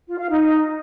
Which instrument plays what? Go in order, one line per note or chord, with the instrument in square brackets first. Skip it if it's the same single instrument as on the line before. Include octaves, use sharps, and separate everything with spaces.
[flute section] F4
F5
D#4